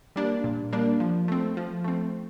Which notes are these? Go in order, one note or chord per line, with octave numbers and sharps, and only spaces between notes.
G3 A#3 D4
A#2
G3 A#3 D4
F3
A3 C4
F3
A3 C4